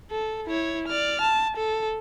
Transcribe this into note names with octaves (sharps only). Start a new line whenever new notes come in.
A4
E4 C#5
D5 F6
A5
A4